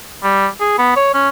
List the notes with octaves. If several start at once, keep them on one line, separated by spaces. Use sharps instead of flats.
G3
G#4
B3
C#5
C#4